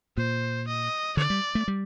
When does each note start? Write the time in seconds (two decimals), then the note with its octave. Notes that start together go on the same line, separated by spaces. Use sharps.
0.17 A#2 C5
0.67 D#5
1.17 D3 D5
1.30 G3
1.55 A3
1.68 G3